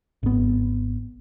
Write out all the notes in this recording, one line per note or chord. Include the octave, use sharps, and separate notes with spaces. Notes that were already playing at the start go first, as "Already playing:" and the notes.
G#1 B3